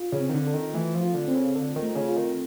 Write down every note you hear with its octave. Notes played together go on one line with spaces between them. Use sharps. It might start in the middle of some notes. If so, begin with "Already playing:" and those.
Already playing: F4
C#3
C4
D#3
D3
A4
D#3
E3 A3
F3
F4
D3
C4
C#3
D3 A4
D#3
A3
C#3
F4
D#3